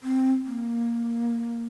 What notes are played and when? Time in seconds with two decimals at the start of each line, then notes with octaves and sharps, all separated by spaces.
0.03 C4
0.46 A#3